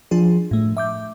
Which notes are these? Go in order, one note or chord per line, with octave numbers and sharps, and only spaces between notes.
F3 D4 F4 G#4
A2 A3
E5 D6 G6